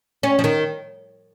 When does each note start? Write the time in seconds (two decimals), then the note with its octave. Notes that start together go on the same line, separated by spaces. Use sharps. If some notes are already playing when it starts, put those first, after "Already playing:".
0.23 C#4
0.39 F3
0.44 D#3